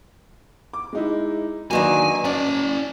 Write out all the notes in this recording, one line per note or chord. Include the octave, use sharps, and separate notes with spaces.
D6
G#3 D#4 E4
D3 D#3 F#3 A#3 B4 G#5 E7
C#4 D5 A5